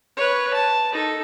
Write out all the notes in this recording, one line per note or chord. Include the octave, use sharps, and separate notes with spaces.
B4 C#5
A5
D#4 A4